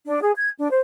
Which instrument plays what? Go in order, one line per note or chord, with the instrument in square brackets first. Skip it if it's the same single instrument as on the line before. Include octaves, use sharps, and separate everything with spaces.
[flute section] D4
G#4
G#6
D4
C5